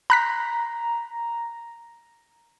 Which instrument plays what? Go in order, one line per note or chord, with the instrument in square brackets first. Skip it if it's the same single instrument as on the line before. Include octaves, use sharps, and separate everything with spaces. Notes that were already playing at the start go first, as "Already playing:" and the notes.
[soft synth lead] A#5 [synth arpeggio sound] B5 F#6 B6